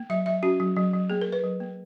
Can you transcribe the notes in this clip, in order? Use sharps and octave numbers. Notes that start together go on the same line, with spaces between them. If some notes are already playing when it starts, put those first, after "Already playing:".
Already playing: A#3
F#3 E5
F#3 E5
C#4 F#4
F#3
F#3
F#3
A#3 G#4
A#3 A#4
B4
F#3
A#3